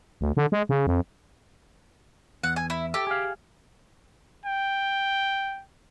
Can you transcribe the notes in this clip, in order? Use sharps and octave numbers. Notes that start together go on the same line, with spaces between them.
D2
D3
G#3
C#3
F2
E2 F#5
G#5
E4
G4 A4
G#4 F5
G5